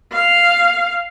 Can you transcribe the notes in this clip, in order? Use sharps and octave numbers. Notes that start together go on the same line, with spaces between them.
F5